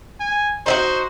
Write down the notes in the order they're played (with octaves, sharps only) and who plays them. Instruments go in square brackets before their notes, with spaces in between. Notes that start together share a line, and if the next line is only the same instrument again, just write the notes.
[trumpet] G#5
[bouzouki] D#4 E4 F#4 [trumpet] C5